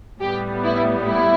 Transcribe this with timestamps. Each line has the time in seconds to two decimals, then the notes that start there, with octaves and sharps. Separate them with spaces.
0.21 A2 G3 B3 G4
0.64 E4
1.07 E4